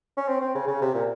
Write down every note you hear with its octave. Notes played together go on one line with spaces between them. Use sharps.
C#4
C4
C4
C#3
C#3
C3
A#2